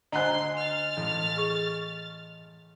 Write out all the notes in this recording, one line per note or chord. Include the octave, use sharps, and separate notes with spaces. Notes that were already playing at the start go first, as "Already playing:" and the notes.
D2 C5 D#5 F#5 G#5 A#5 C6 F#6
F6 A6
A1
G#4 C#6